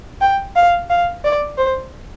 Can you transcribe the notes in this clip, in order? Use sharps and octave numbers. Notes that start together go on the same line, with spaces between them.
G5
F5
F5
D5
C5